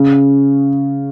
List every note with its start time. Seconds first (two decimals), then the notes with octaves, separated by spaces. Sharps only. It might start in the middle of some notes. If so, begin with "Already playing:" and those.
Already playing: C#3